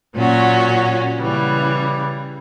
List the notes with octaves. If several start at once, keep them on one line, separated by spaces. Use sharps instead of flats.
A#2 F#3 C#4 F#4
C#3 E3 G3